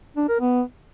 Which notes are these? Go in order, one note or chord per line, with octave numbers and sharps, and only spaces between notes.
D4
A#4
B3